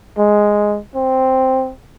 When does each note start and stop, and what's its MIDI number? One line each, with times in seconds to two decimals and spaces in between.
0.18 0.79 56
0.95 1.72 60